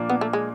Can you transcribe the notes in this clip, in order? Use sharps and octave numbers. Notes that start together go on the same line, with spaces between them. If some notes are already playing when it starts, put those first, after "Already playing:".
Already playing: A#2 F3 A#3 D4
B3
A3
G#3